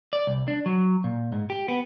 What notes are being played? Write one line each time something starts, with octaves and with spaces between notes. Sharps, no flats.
D5
C2
D4
F#3
A#2
G#2
G4
B3